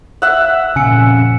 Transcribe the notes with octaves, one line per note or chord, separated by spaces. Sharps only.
E5 F#5
F2 A#2 C#3 G#5 E6 C#7